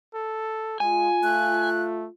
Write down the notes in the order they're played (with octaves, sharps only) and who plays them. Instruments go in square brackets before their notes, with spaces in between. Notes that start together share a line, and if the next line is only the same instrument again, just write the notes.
[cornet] A4
[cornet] G#3 [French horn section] F4 [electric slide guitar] G#5
[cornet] A3 [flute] F#6